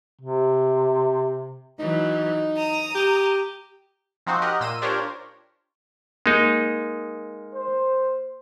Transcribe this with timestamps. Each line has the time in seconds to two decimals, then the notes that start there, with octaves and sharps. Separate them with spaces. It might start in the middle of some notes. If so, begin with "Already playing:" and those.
0.21 C3
1.79 E3 F#3 D#4
2.57 A#5 D#6
2.95 G4
4.26 F3 C4 D#4 F#4 C5
4.42 G4 A#4 D#5 F#5
4.60 A#2 C6 E6 A#6 D#7
4.82 D4 F4 G4 A#4 C5 C#5
6.26 G#3 A#3 D#4 C#7
7.54 C5